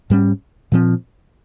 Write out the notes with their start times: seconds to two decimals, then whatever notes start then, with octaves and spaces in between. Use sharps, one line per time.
0.10 G#2 G3 C#4
0.72 A#2 F3 C4